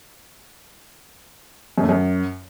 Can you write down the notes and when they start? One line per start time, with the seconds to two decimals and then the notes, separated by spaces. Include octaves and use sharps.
1.78 F#2
1.83 A3
1.89 F#2